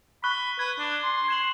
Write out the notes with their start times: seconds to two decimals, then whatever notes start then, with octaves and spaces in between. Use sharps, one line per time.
0.24 B5 C#6 F#6 G7
0.59 B4 G#6
0.79 D4
1.03 C6
1.28 G#6 E7 F#7